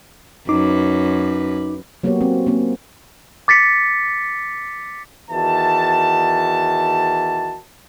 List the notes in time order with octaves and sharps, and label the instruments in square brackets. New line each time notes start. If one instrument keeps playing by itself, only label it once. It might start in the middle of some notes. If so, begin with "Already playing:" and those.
[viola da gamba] F#2 B4 [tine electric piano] D#4 D6
[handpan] F#3 A#3 B3 F#4 G4 C#5
C4
A#3 C4 C#4
[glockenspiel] D6 A6 B6 C#7
[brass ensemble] E2 D#3 E3 F#4 A5